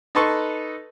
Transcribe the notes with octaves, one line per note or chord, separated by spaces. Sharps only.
D#4 A4 B4 A5 C6 C#6